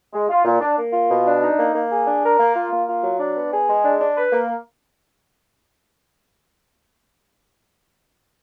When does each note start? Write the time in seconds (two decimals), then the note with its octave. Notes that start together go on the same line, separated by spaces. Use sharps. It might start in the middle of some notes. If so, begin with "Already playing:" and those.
0.13 G#3
0.29 F4
0.45 A#2
0.61 D4
0.77 A#3
0.93 F4
1.10 B2
1.26 D4
1.43 D#4
1.58 A#3
1.75 A#3
1.90 G#4
2.06 D4
2.23 A#4
2.39 A#3
2.54 F4
2.72 A#3
2.87 F4
3.03 F#3
3.20 D4
3.36 B3
3.52 G#4
3.67 G#3
3.84 D4
4.00 D4
4.16 B4
4.33 A#3